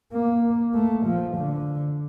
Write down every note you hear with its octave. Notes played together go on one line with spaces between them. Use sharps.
A#3
A3
F3
D3